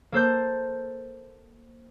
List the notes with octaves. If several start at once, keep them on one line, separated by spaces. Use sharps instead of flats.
A#3 A4 C5 G6